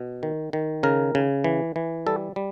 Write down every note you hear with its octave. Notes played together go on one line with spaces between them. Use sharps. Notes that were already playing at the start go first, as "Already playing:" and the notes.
Already playing: B2
D#3
D#3
C#3 A#4
C#3
E3
E3
G3 A4
G3